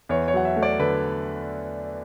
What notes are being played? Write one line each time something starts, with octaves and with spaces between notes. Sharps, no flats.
E2 C#5
C#5
F#3 F#5
E5
A3
D5
D3 B4